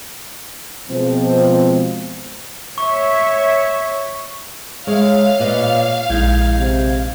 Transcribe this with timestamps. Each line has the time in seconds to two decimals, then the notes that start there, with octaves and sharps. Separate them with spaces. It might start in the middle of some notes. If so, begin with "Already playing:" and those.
0.90 B2 F3 G#3 C4
2.78 C#5 E5 C#6
4.87 G#3 C#5 E5 F5
5.40 A#2 B4 D#5
6.09 A#1 G#3 D#4 E4 G6 G#6
6.58 C3